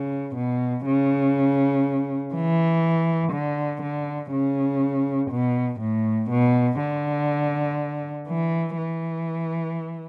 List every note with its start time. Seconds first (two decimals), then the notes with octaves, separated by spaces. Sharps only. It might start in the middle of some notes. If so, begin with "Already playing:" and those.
Already playing: C#3
0.36 B2
0.86 C#3
2.34 E3
3.33 D3
3.82 D3
4.32 C#3
5.31 B2
5.80 A2
6.30 B2
6.80 D3
8.28 E3
8.77 E3